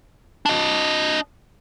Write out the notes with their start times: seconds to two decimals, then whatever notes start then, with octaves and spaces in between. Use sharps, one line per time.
0.46 D4 D#5